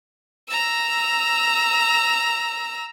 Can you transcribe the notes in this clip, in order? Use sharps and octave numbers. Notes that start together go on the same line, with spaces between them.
A#5 E6